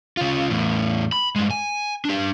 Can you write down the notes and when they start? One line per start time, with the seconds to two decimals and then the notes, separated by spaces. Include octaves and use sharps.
0.17 C#3 F4
0.50 E2 A2
1.12 B5
1.36 G2 G#3
1.51 G#5
2.05 D4 G4